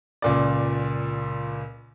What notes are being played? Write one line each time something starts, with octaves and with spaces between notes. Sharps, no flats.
C#2 A#2 D5